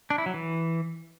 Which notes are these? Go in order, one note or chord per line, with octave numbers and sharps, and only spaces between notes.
D4
E4
F#3
E3